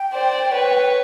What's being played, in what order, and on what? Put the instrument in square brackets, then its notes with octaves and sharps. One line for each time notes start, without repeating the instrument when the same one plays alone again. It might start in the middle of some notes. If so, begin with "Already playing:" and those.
Already playing: [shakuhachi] G5
[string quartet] C5 D5
B4 C#5